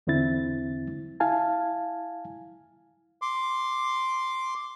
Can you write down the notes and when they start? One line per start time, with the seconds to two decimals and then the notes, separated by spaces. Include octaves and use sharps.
0.07 E2 D3 C4 E4 A6
1.20 E4 F5 G#5 A5
3.22 C6 D6